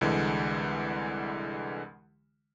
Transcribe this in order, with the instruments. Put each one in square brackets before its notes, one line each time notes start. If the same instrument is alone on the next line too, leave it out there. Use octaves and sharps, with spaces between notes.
[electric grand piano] C2 D3 E3 G#3